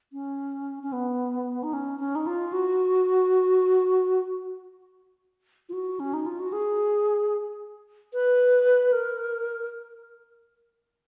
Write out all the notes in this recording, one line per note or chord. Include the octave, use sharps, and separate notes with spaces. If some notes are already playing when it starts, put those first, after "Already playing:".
C#4
C#4
B3
D#4
C#4
C#4
D#4
F4
F#4
F4
F#4
C#4
D#4
F4
F#4
G#4
B4
A#4